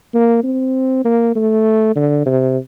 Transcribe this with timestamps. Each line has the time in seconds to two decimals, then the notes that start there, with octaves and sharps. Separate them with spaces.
0.14 A#3
0.44 C4
1.05 A#3
1.35 A3
1.96 D3
2.26 C3